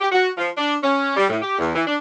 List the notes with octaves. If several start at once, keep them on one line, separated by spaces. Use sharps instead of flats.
G4
F#4
F3
D4
C#4
G3
A2
G4
E2
E3
D4